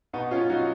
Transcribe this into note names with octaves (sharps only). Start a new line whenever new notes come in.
B2 B3 D#4
C#4 F4
F#3 D#4 F#4